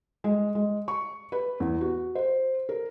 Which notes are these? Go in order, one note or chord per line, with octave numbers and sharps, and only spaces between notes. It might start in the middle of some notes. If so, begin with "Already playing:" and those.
G#3
G#3
C#6
B4
E2
F#4
C5
A#4